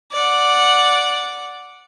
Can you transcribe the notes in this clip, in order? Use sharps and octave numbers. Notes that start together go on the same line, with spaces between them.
D5 F#5